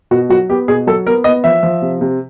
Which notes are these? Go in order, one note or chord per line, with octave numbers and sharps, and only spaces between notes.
B2 F#4
F#3 F#4
B3 G4
B2 G#4
F#3 A4
B3 A#4
B3 D#5
F3 E5
F3
C3
C3